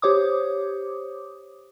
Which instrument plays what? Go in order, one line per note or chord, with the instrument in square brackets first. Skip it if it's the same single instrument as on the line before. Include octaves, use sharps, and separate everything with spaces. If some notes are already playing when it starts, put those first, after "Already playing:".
[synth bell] G4 C5 C#5 D6 D#6